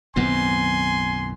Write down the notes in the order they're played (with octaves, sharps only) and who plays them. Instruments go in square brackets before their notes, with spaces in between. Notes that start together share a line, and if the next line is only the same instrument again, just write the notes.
[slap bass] B1 F#2 A2 [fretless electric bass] D#3 B3 C4 [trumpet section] G#5 C6